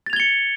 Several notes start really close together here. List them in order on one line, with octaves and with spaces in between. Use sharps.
A6 F7 G#6 G7 C#7